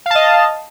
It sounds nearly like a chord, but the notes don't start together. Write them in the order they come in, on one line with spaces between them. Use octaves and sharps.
F5 A5 D#5